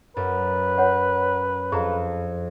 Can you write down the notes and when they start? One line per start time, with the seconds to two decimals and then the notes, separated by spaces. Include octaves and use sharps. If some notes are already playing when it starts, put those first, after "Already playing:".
0.17 F#2 B4
0.78 C#5 F#5
1.72 F2 G#4 A#5